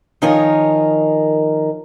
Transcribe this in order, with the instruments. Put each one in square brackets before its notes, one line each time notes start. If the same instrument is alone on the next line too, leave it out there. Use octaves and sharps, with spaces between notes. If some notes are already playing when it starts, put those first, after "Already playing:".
[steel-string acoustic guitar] D#3 F3 D#4 A#4 C#5 G#5